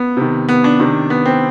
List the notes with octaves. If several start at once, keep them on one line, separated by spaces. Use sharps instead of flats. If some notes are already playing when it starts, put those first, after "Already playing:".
Already playing: B3
C3 D#3
B3
D4
C3 D#3
B3
C4